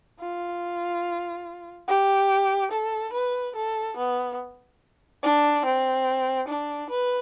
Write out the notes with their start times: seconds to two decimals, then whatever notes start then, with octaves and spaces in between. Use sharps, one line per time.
0.20 F4
1.88 G4
2.72 A4
3.13 B4
3.55 A4
3.97 B3
5.22 D4
5.65 C4
6.48 D4
6.90 B4